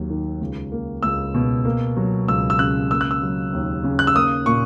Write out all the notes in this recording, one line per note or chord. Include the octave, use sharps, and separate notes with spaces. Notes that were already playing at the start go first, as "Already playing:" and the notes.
Already playing: D#2 F#3
D#3
C#2
A#3
C#2 E6
B2
A#3
F#3
C#2 E6
E6
C#3 F#6
A#3 E6
F#6
E6
F#3
D#2
C#3
F#6
E6
A#3 D#6
A#2 C#6